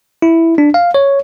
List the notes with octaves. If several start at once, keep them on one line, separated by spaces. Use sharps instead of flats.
E4
D4
F5
C#5